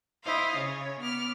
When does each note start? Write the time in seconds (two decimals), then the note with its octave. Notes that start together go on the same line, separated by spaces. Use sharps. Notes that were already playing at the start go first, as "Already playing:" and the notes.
0.23 E4 C5 D#5 F5
0.56 C#3 C#5
1.01 B3 D6 F6